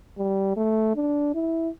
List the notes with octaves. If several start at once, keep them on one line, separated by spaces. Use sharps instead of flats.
G3
A3
D4
E4